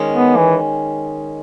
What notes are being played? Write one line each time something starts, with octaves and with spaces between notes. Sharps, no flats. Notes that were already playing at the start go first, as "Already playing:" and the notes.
Already playing: D#3 G#3 C#4
B3
E3